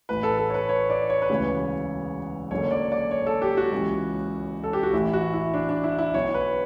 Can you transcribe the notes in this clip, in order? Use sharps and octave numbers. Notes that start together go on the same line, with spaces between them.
A1 A2 E3 B4
A4
A4
C#5
B4
C#5
D5
C#5
B4
E1 D2 C#3 E3 C#5
F#1 F#2 D3 C#5
D5
D5
C#5
A4
G4
F#4
C#2 C#3 E3
A4
G4
F#4
A1 A2 E3 E4
F#4
E4
D4
D4
E4
E4
B1 B2 C#5
B4